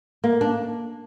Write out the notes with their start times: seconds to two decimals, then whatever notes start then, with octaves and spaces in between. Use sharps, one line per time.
0.24 A#3
0.41 D4